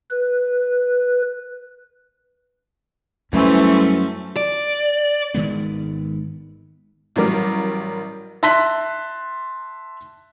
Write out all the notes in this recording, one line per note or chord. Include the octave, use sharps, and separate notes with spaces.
B4
F#2 E3 G3 A3 C#4 C5
D5
G#1 D#3 G#3 B3
A1 F#3 G3 A#4 D6
E5 A5 C6 F#6 B6